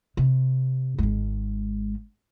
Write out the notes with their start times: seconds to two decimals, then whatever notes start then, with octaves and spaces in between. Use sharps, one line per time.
0.17 C3
0.98 G#1 G#3